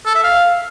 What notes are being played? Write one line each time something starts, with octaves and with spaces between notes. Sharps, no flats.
A4
E5
F5